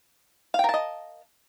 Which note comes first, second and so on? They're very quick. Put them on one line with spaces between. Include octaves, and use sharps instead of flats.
F5 G5 A#4 A5 D#5